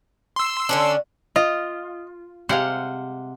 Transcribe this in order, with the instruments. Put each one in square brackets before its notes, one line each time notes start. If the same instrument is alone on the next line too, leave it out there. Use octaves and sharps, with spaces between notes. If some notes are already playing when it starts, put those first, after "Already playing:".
[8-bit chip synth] C6 E6
[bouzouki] D3 C#4 D4
[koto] F4 [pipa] D#5
[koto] C3 C5 F#5 [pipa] G3 G#3 F5